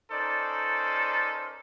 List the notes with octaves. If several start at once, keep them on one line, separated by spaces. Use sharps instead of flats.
C#4 D#4 A4 A#4 C5 D5